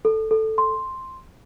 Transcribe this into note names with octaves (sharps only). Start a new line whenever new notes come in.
A4
A4
C6